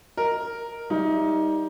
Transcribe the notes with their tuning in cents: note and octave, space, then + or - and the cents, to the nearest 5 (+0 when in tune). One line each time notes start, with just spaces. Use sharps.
A#4 +0 D#5 +0
G3 +10 D#4 +20 E5 +0